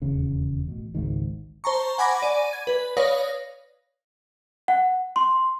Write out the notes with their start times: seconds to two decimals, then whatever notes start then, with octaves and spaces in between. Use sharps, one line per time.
0.02 D#1 E2 C#3
0.68 A1 B2
0.95 G#1 C#2 G#2 D#3
1.64 C5 A5 A#5 C#6
1.98 F#5 G#5 B5 D6 A#6
2.22 D5 D#7
2.53 G#6
2.67 B4
2.97 B4 C#5 D5 F5 D#6 A#6
4.68 F#5
5.16 C6